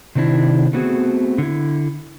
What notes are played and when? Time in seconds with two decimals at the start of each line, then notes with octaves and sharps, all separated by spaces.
0.15 C3 D#3 C4 D4 E4
0.73 A3 B3 C4 F#4 G#4
1.38 D3 E4